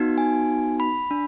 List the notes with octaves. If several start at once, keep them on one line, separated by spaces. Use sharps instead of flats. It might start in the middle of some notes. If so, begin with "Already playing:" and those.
Already playing: B3 D#4 F#4
G#5
B5
D4